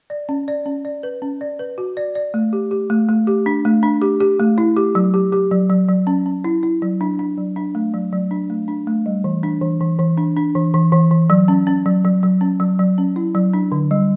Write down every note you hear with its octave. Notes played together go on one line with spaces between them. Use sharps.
D5
C#4
D5
C#4
D5
B4
C#4
D5
B4
F#4
D5
D5
A3
G4
G4
A3
A3
G4
D4
A3
D4
G4
G4
A3
E4
G4
F#3
G4
G4
F#3
F#3
F#3
C#4
C#4
E4
E4
F#3
D4
D4
F#3
D4
A3
F#3
F#3
D4
A3
D4
A3
G3
E3
D4
E3
E3
E3
D4
D4
E3
E3
E3
E3
F#3
C#4
C#4
F#3
F#3
F#3
C#4
F#3
F#3
C#4
E4
F#3
D4
D3
G3